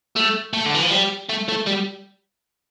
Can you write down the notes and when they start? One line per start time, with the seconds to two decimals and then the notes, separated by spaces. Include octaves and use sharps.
0.16 A3
0.53 A3
0.66 D3
0.75 E3
0.82 F3
0.91 G3
1.29 A3
1.49 A3
1.66 G3